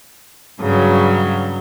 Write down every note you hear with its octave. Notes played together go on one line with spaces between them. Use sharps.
G2 C#3 F#3